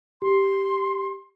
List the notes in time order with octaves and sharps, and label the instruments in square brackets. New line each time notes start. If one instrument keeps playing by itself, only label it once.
[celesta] G4 [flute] C6